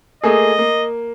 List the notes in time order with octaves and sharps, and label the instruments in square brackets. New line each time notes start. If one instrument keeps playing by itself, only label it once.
[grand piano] A3 A#3 G#4 [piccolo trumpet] D#5
[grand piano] A#3